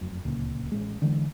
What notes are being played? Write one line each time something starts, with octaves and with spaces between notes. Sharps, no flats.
F1 F#2
D1 C#2 A#2
A1 G#3
D3 E3 G#3